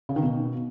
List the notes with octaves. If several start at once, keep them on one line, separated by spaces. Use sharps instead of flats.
C#3
D#3
B2